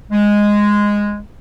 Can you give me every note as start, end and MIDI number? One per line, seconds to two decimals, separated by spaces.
0.11 1.18 56